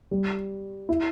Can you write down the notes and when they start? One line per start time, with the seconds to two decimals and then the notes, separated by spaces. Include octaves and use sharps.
0.11 G3
0.89 E4